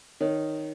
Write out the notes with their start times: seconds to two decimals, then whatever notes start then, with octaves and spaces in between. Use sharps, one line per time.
0.21 D#3 C#5